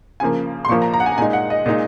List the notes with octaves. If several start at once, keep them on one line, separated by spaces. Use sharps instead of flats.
C#3 F3 A#3 G#5
C6
A#2 F3 A#3 C#6
A#5
A#5
F#5
G#5
A#2 G#3 D#4 G#5
F#5
D#5
A#2 G#3 D#4 D#5